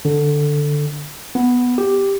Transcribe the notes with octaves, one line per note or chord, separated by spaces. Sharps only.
D3
B3
G4